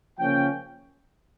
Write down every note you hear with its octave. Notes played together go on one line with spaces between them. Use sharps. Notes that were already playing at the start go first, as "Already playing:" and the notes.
C#3 F3 A#3 C#4 G5